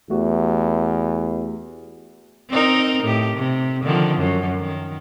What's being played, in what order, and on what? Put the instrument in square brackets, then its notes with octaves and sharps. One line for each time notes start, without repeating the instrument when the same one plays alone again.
[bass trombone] E2 [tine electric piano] A3 F#4 G4
[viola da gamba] C4 D#4 A#4
A2 G4
C3
D3 D#3 F3
F#2
D#3